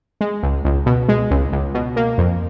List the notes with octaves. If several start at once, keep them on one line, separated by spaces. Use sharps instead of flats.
G#3
C#2
C#2
B2
G#3
C#2
C#2
B2
A#3
F2